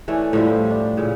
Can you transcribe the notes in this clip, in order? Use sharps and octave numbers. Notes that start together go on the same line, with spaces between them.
E3 A3 C#4 D5
A2 F3 G3
D4
A#2 C#3